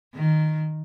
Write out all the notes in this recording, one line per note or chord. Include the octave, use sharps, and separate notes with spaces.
D#3